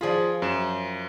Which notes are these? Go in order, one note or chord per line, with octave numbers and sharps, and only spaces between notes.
F3 F4 G#4 D5 B5
F#2 E7